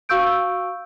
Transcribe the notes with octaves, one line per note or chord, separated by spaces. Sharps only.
F#4 F5 C#6 E6 G6 D7